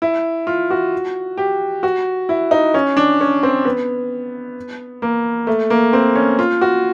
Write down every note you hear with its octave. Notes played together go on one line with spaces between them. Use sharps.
E4
F4
F#4
G4
F#4
E4
D#4
C#4
D4
C#4
C4
B3
A#3
A3
A#3
C4
C#4
F4
F#4